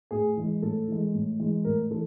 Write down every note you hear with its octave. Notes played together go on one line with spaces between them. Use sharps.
A2 G#4
E3 G#3
A2 A4
E3 G#3
A2
E3 G#3
A2 A#4
E3 A4